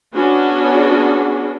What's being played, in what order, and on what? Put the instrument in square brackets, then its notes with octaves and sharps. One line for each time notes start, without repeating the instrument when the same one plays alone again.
[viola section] B3 C#4 D4 F#4 G#4